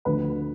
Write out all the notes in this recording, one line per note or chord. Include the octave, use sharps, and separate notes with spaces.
D2 D3 F3 B4